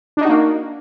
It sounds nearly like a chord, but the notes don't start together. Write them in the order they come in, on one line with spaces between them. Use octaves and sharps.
D4 D#4 F#4 A#3